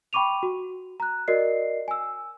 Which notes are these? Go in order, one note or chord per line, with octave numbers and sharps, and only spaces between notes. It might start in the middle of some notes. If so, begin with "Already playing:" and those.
G5 B5 C#6 D6 D#7 F7
F#4
A#5 F#6
F#4 A#4 D5 D#5 C7
G#5 E6